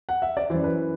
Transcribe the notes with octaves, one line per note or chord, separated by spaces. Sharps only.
F#5
E5
D5
F#2 E3 C5
B4